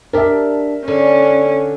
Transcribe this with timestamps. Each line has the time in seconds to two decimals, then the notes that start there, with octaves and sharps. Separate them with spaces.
0.13 D4 G4 A#4 E5
0.88 D3 C#4